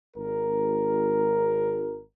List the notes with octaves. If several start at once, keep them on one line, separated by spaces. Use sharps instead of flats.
G#1 A#4